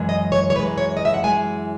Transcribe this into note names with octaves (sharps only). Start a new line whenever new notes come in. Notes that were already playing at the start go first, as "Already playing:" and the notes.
Already playing: F#2 E3 G#3
D#5
C#5
C#5
F#2 E3 G#3 B4
C#5
D#5
E5
F#5
F#2 E3 G#3 G#5